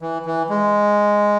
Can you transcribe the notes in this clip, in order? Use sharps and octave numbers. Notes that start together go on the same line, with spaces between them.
E3
E3
G#3